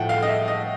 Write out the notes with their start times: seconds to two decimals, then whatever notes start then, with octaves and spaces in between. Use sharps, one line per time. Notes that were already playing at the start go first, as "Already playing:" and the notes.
Already playing: A2 F3 A3 F#5 G5
0.09 F5
0.23 D#5
0.28 E5
0.48 D#5